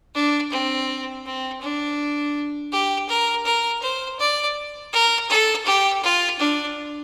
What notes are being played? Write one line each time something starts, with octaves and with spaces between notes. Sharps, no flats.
D4
C4
C4
D4
G4
A#4
A#4
C5
D5
A#4
A4
G4
F4
D4